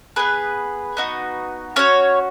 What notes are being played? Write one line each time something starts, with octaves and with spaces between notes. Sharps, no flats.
B3 G#4 B4
B3 D#4 F#4
C#4 F#4 C#5